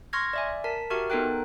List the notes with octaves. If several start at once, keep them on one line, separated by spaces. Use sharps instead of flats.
C6 C#6 F6 G#6 A#6
D5 E5 G#5
A#4 A5 B6
F#4 G4 A#4 E5 C#6 F6
B3 D#4 A4 A#4 G5 F#6